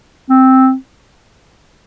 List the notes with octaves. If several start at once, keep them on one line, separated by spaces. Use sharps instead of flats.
C4